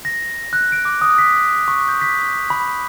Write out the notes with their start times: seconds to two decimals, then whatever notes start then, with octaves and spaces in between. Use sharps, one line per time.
0.05 A#6
0.53 F#6
0.72 D7
0.85 D6
1.01 D#6
1.18 B6
1.68 C#6
1.89 G6
2.02 B6
2.50 B5